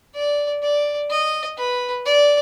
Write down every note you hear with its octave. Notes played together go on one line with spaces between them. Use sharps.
D5
D5
D#5
B4
D5